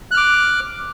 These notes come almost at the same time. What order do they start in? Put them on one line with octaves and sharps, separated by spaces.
F#6 F6 D6